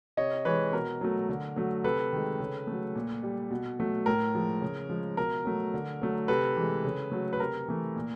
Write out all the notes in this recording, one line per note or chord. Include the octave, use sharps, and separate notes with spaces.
C3 C#5 D#5
E3 G#3 B4 C#5
B2 A#4
F#3 A3
D3
F#3 A3
C3 A4 B4
D#3 G#3
C#3
F#3 A3
A#2
G3
B2
F#3 A3
A2 A#4
F3 G#3
C#3
F3 G#3
B2 A#4
F#3 A3
D3
F#3 A3
C3 A4 B4
E3 G#3
C#3
F#3 A3
B4
C3 A#4
E3 A3
A#2